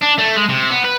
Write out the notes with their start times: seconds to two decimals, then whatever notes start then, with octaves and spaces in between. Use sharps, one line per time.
0.03 D4
0.19 A3
0.36 G#3
0.49 C3
0.70 B3
0.84 B4